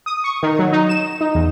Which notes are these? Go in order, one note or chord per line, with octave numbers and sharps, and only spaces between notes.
D#6
C#6
D#3
F#3
D#4
E7
D#4
E2